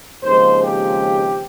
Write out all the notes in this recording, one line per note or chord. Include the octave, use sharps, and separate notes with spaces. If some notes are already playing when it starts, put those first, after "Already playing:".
D#2 C#3 F3 G#3 C4 C5
G4